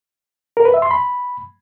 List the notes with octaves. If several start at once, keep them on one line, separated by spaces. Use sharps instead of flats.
A#4
B4
E5
C6
B5